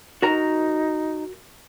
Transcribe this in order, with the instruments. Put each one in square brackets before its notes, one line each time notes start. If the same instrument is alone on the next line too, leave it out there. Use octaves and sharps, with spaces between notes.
[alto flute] D#4 [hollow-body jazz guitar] F#4 A#4 A#5